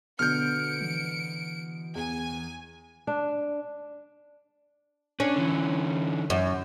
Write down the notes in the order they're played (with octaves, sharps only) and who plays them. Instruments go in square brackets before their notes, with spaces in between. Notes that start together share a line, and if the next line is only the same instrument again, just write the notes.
[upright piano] B2 D3 B3 [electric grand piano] F6 G6 [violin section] C#7 D7
[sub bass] E3
[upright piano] E2 [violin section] G#5
[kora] D4
[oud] C#4 [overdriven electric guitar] D4
[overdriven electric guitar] D3 E3
[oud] F#2